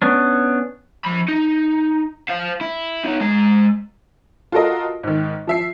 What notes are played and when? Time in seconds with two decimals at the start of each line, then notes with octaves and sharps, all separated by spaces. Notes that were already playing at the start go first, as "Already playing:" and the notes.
0.02 B3 C#4 D4
1.05 F3 B5
1.28 D#4
2.29 C5 F5
2.61 E4
3.05 B3 D#4
3.21 G#3 A#5
4.52 F4 F#4 A4 A#4 D#5
5.04 G#2 D#3
5.47 F3 E5 C7